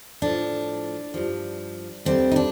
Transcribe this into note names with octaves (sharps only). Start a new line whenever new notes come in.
A2 F3 D4
G2 F3
D#2 D3 G3 C4
D#4
D4